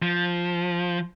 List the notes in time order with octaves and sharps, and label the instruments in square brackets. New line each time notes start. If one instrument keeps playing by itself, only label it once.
[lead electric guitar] F3